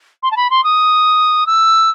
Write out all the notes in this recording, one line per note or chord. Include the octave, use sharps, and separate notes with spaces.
C6
A5
B5
C6
D#6
E6